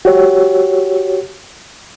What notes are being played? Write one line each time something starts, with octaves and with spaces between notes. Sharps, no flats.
F#4 G4 C#5